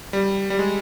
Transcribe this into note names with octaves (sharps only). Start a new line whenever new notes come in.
G3
G3
G#3